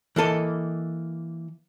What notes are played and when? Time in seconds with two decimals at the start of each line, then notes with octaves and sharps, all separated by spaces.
0.16 E3 A#3 A4 D#5